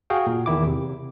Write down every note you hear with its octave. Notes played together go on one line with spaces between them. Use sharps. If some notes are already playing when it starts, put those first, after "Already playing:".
F#4 G#4 F5 G5
A#2
E2 D#3 E4 D6
C3